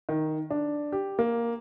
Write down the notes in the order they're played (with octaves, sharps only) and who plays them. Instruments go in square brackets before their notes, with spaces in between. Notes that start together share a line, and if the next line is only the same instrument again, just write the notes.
[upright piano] D#3
D4
G4
A#3